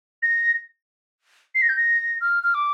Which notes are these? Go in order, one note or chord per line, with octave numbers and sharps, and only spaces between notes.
A#6
C7
A#6
G6
A#6
F6
F6
D6